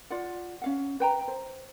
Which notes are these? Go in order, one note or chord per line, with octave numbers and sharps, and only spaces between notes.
F4 D5 F#5
C#4 F5 F#5
B4 G5 A#5
C5